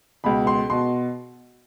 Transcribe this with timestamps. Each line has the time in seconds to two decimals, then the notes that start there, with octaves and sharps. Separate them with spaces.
0.24 C#2 B2 B5
0.47 C6
0.70 B2 C6